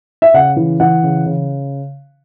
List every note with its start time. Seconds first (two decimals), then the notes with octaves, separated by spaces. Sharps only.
0.22 E5
0.34 C#3 F#5
0.57 E3
0.80 E3 F#5
1.03 C#3
1.26 C#3